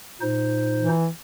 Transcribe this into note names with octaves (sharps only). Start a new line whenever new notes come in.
A#2 D#4 C5
E3